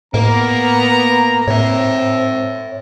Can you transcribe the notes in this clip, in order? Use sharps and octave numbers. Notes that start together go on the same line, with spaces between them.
A2 A#3 B3 A#5
A2 C4 C#5 E5